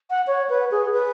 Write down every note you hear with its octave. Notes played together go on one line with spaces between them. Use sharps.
F#5
C#5
B4
G#4
B4